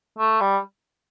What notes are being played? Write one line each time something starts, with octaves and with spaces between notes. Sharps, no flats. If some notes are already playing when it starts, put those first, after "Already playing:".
A3
G3